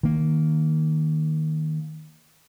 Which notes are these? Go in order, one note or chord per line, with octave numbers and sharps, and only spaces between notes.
D#3 A#3